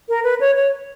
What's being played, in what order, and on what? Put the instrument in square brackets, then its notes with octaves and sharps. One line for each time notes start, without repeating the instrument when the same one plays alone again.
[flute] A#4
B4
C#5
C#5